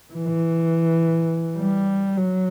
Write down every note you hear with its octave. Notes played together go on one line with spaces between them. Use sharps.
E3
G3
F#3